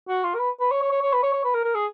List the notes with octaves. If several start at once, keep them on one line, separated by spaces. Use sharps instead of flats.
F#4
F4
A#4
B4
B4
C#5
C#5
C#5
C#5
B4
C#5
C#5
B4
A#4
A#4
G#4